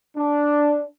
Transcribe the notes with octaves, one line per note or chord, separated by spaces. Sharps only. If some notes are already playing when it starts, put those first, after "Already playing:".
D4